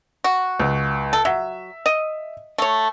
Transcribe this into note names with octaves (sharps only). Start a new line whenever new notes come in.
F#4
C#2
A4
F#3 E5
D#5
A3 C#5